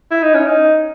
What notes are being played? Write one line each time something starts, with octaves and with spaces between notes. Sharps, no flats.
E4
D#4
C#4
D#4